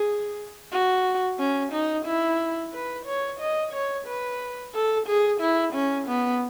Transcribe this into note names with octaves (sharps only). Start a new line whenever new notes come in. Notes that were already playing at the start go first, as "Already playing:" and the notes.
Already playing: G#4
F#4
C#4
D#4
E4
B4
C#5
D#5
C#5
B4
A4
G#4
E4
C#4
B3